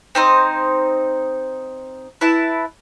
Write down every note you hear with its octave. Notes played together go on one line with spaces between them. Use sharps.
C4 D#4 C5
E4 B4 A5